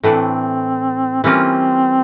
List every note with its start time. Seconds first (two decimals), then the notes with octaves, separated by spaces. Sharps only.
0.03 A2 E3 A3 C4 D4
1.24 E3 G3 A#3 C4 C#4 F4